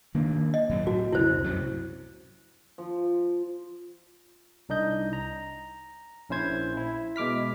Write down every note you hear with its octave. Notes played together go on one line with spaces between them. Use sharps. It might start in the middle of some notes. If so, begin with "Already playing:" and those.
D#3 A#3 D4
D#5
A2 F#3 C4
F#4
C2 F2 C#3 E4 C5
F#2 C3 F#3
F3
C2 D4 D#4 D#5 G6
A#5
A#1 C#4 E4 C5 G#6
E4
B2 G#3 D6 F6 B6